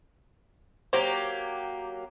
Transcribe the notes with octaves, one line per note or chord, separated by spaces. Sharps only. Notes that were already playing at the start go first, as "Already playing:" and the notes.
F#3 A#3 G4 C5